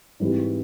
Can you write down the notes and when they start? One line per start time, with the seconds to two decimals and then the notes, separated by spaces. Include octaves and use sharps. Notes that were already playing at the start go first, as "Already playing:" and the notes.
0.20 G#2 E3 G3 C4